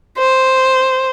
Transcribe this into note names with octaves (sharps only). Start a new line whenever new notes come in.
C5